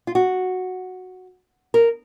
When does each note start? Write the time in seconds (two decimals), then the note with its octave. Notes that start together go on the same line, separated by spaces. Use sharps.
0.07 F4
0.15 F#4
1.74 A#4